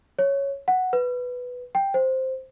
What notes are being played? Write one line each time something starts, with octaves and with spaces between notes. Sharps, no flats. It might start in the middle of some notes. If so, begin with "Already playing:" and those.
C#5
F#5
B4
G5
C5